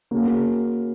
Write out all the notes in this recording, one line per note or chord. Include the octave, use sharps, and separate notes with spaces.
C#3 A#3 F#4